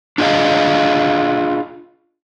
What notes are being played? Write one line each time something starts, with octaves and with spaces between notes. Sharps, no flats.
D4 F4 G#4 D#5 F5